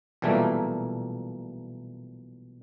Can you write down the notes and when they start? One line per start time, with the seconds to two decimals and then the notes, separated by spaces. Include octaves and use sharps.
0.22 B1 A#2 E3 G3 A3 A#3